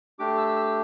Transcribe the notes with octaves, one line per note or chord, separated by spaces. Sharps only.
A3 D4 G4 D6
E6
E6